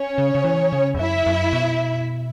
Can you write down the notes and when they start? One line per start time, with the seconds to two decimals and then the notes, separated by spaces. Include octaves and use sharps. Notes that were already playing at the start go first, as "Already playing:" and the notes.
Already playing: C#4 C#5
0.18 C#3
0.35 C#3
0.44 E3
0.72 C#3
0.94 E2
0.99 F#2 E4 E5
1.26 F#2
1.53 B2